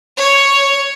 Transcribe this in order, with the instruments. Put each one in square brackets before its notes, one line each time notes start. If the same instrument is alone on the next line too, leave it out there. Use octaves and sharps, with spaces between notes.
[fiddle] C#5